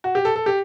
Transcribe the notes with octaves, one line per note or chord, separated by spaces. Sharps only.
F#4
G4
A4
A4
G4